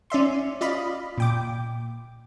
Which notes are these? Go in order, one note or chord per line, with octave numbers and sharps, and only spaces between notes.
C#4 D5 E5 C6
F4 D5 D#5 F5 B5
A#2 G5 D6